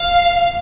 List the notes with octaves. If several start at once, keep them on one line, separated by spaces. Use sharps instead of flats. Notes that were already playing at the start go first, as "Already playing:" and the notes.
Already playing: F5